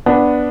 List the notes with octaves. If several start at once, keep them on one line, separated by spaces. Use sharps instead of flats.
B3 D4